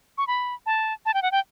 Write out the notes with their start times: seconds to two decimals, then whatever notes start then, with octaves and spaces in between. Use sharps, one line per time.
0.18 C#6
0.27 B5
0.66 A5
1.06 A5
1.14 G5
1.22 F#5
1.32 G5